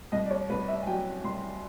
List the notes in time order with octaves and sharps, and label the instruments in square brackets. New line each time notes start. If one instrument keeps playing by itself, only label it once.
[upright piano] C2 D#5
D5
C#5
C2 B4
E5
G#5
F#3 G5
C2 C6